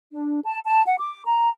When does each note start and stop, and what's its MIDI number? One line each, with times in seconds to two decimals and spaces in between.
0.13 0.40 62
0.44 0.59 81
0.66 0.84 81
0.86 0.96 78
0.99 1.23 86
1.26 1.50 82